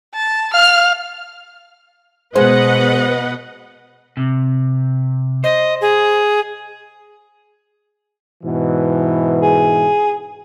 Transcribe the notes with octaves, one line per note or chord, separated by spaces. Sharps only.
A5
F5 F6
B2 G#3 B4 C5 D#5 F#5
C3
C5 D#5
G#4
G#2 B2 E3
G#4